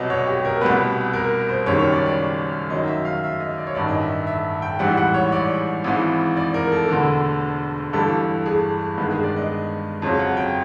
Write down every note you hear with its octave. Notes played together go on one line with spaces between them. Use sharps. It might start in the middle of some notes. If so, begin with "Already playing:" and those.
Already playing: C2 B2 F#3 B3 D5 D#5
C#5
G4
A#4
C2 B2 G3 B3 B4
A#4
C5
F#1 F#2 D#3 G3 C#5
C#5
D5
D5
F#2 D#3 F#3 D#5
E5
F5
E5
D#5
D5
C#5
A1 G2 D#3 D5
D#5
E5
E5
G5
A1 G#2 E3 G3 F#5
F#5
C#5
D5
G#1 G#2 E3
D5
A#4
A4
E1 D2 D3
G1 G2 E3 G3 A4
G#4
G2 D#3 G#3 B3
G#4
D5
D#5
F2 C#3 F#3
F#5
G5